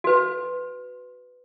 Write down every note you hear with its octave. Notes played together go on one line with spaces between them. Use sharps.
F#4 B4